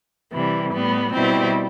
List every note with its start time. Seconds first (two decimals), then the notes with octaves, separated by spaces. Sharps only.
0.32 C3 E3 G3
0.72 A2 G3 B3
1.13 B2 G3 C4 E4